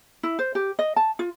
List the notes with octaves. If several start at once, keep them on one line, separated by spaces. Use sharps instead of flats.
E4
C5
G4
D#5
A5
F4